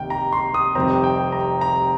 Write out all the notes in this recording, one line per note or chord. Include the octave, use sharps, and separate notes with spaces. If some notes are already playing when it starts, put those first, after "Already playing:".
Already playing: F1 D#2 D#3 G5
A#5
C6
D#6
F1 F2 D#3 G3 C4 A#5
G5
A#5
A#5